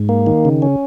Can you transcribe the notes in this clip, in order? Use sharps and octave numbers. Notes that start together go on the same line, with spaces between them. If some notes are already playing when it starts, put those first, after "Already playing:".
Already playing: G#2
A#3
D#3
C#3
C#4